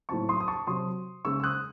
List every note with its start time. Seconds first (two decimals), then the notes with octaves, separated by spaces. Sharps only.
0.09 A2 F#3 C4 A5 C#6
0.29 C6 D#6
0.40 D#6
0.48 A5 C#6
0.67 C3 F#3 C4 C6 D#6
1.25 C#3 G#3 C#4 C#6 E6
1.40 E6
1.44 D#6 F#6